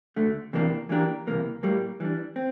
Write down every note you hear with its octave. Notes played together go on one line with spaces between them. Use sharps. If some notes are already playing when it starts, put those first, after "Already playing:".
D2 D3 A3
E2 C3 E3 A#3 D4
E3 A#3 D4 G4 A#4
C2 C3 E3 A#3
A2 G3 A#3
E3 G3 D4
C4